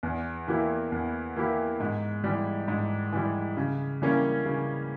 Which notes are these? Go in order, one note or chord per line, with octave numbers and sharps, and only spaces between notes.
E2
E3 A#3 E4 G4
E2
E3 A#3 E4 G4
G#2
E3 G3
G#2
E3 G3
C#3
E3 G3 A#3 C#4
C#3